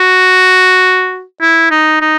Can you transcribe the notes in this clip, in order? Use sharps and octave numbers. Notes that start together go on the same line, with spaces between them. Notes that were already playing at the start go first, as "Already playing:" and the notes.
Already playing: F#4
E4
D#4
D#4